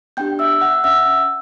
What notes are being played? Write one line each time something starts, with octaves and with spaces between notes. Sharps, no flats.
B3 D4 G4 G5 G6
E5 E6
F#5 F#6
C#4 E5 E6